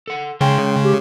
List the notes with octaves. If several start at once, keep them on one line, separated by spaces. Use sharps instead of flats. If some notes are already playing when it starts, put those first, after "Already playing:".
A4 F#5
C#3 G#3 F4 G5 C6
G4